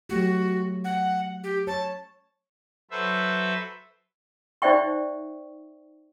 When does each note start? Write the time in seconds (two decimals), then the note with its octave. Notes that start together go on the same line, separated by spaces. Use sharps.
0.09 F#3 A3 F#4 G4
0.84 F#5
1.43 G4
1.67 C#5 A5
2.91 F#3 A4 B4 C5 E5
4.62 D#4 C5 D5 E5 G5 C#6